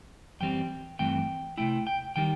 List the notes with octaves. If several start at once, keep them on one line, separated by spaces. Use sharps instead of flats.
F#2 E3 G3 C4 G5
G2 E3 A3 C4 G5
C3 D#3 A3 E4 G5
G5
D#3 G3 D#4 G5